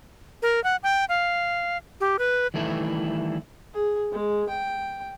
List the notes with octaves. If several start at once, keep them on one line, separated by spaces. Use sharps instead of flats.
A#4
F#5
G5
F5
G4
B4
D#3 E3 G3 A3 E4 A4
G#4
G#3
G5